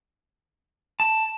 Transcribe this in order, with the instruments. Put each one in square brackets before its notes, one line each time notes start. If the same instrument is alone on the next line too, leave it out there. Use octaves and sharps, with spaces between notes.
[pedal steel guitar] A5